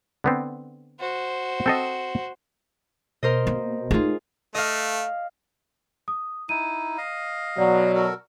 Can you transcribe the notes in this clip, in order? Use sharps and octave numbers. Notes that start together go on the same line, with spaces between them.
D3 B3 C4
F#4 C5
C4 A4 D#5
B2 A#4 C5 D#5
A#3
A3 D#4 F4 G#4
A3 D#5 F5
D#6
D#4 E4 D#7
D#5 F5
B2 F#3 D5
F#4 A4 A#4